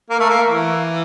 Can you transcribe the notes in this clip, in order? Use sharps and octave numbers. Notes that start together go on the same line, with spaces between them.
A#3
A3
A#3
E3